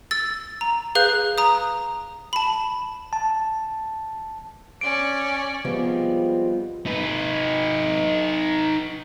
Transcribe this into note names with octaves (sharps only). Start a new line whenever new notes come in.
E6 A6
A#5
G#4 B4 F5 F#6 G6
A#5 D#6
A5 B5
A5
C#4 D5 D7
F3 G3 G#3 B3 C4 F4
D#4 B4